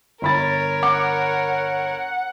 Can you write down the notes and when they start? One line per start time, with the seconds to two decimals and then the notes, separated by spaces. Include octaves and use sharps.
0.22 G1 A#4 C#5 B5 A6
0.83 F#5 D6